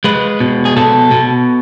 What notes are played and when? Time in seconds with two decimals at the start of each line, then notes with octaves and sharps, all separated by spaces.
0.04 G#3 B4
0.40 B2
0.65 G#4
0.76 B2 A4
1.11 B2